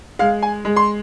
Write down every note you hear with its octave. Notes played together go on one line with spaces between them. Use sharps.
G#3 F5
G#5
G#3
C6